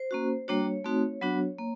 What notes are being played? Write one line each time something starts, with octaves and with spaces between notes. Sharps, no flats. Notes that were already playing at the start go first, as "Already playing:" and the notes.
Already playing: C5
A#3 C#4 F#4
G3 A#3 D4 F#4 C#5
A3 C4 D#4 F#4
F#3 B3 D4 F#4
A#3